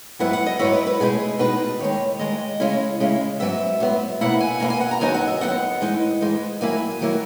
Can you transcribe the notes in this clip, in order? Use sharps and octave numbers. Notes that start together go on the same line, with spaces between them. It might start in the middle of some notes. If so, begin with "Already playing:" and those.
G#2 F#3 B3 E4 F#5
F#5
D#5
G#2 F#3 B3 E4 C#5
B4
B4
B2 G#3 D#4 G#4
G#4
B2 G#3 D#4 B4
D#2 D#3 G#3 C#5
D#2 D#3 G#3 D#5
C#3 G#3 C#4 E4
C#3 G#3 C#4 E4
G#2 F#3 B3 E5
G#2 F#3 B3
B2 A#3 E4 F#5
G#5
B2 A#3 E4 A#5
G#5
F#5
A#5
D#2 C#3 F#3 B3 D#4 G#5
F#5
E5
D#2 C#3 F#3 B3 D#4 F#5
G#2 E3 G#3 D#4
G#2 E3 G#3 D#4
D#3 F#3 A#3 E4 G#5
D#3 F#3 A#3 E4